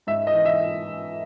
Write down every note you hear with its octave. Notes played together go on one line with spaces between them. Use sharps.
G#2 E5
D#5
E3
E5